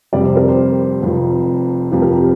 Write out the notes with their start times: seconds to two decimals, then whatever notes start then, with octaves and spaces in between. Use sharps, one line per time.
0.13 F1 F2 C3 G3 D5
0.25 C5
0.36 A#4
0.48 C5
1.02 F1 F2 F3
1.92 F1 F2 F3 G4
2.02 A#4
2.12 G4